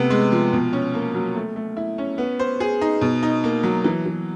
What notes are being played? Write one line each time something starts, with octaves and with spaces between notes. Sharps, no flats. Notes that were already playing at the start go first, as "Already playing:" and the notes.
Already playing: C3 A3 B3
G#3
F3
B2
C#4
A#3
F#3
A3
A3
E4
C#4
B3
C5
G#4
D#4
B2
D#4
A#3
F#3
E3
E3